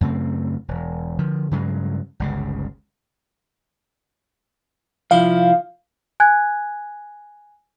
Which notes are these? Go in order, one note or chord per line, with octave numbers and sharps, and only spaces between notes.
F#2 C#3 A3 C4
E1
D3 F3
G2 C#3 F#3 G#3
G1 C#2 C#3
C2 F3 E4 F5
G#5 F#6 G#6